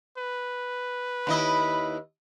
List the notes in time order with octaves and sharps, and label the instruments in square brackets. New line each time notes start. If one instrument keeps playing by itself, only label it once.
[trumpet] B4
[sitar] D#2 E4 D#5 [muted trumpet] B5